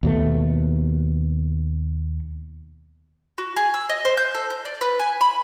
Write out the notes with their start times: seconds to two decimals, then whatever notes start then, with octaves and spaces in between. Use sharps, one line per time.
0.03 D#2 B2 A3
3.38 F#4
3.56 G#4
3.74 E6
3.89 D#5
4.05 C5
4.17 G6
4.34 A4
4.50 G6
4.65 D5
4.81 B4
4.99 G#5
5.21 B5